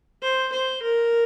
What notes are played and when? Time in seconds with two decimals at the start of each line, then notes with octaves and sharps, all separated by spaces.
0.22 C5
0.52 C5
0.83 A#4